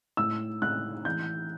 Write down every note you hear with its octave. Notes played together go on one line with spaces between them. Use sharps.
A2 E6
A2 F#6
E3 G6